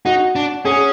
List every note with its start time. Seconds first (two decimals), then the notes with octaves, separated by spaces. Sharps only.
0.05 D#4 F#4
0.36 D4
0.65 C#4 G#4